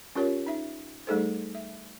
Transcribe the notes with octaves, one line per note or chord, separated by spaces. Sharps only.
C#4 F4 G4 A#4 C#5
D#4 E5
G3 A3 D#4 G#4 A4 C5
E5